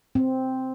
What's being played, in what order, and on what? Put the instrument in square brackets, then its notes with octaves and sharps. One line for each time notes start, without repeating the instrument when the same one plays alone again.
[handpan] C4